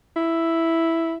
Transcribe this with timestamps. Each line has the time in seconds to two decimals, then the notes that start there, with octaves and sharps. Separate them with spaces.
0.16 E4